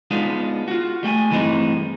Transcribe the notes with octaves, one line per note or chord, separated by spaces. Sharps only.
G#3 B3 D4 D#4 F4
F4 F#4
G3 A3 G5 G#5
G2 E3 G#3 A3 C4 D#4